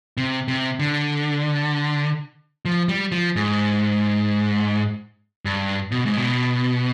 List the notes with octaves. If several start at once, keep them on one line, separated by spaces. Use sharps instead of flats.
C3
C3
D3
F3
G3
F3
G#2
G2
B2
G#2
B2